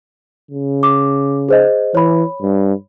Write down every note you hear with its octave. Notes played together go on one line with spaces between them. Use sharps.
C#3
D6
G#4 C5 D#5
E3 C#5 B5
G2